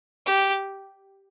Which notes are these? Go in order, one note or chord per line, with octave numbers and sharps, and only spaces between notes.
G4